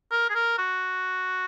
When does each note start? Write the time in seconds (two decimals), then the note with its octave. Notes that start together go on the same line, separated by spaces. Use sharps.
0.12 A#4
0.30 G#4
0.35 A#4
0.58 F#4